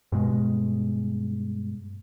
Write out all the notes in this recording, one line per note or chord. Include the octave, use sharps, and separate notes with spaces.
G2 B2 G#3